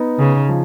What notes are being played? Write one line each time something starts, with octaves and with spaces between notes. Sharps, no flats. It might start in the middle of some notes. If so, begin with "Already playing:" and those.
Already playing: B3 D#4
C#3 G#4
F3